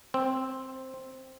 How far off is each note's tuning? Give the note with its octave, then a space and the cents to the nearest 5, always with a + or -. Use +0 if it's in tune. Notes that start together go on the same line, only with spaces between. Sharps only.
C4 +5